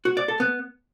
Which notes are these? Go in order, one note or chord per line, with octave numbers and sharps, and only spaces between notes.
F#4
D5
A4
B3